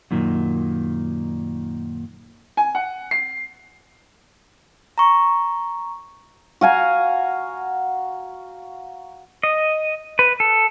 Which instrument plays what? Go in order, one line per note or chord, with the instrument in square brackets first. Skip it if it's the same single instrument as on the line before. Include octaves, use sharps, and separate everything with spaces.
[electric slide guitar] F#2 A#2 D#3
[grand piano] G#5
F#5
C7
[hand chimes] A#5 C#6
[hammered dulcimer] F#4 F5 G#5 A#5
[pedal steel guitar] D#5
B4
A4